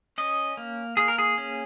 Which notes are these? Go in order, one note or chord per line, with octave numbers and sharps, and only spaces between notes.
C#4 D#5
A#3
A#3 G#4
A#4
G#4
C#4